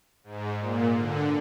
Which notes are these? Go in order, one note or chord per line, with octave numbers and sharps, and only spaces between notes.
G#2
A#2
D3